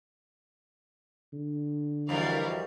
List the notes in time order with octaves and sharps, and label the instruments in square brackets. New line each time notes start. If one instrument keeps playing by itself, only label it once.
[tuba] D3
[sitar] F2 G3 [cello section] E3 E4 F#4 [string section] A#4 D5 F5